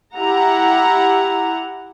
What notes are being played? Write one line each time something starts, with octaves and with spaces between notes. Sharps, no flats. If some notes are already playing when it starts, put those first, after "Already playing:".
E4 G4 F#5 A#5